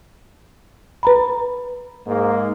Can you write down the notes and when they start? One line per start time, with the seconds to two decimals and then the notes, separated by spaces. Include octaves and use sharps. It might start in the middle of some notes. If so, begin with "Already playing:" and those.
1.03 B4 A#5 B5
2.07 G#2 A#3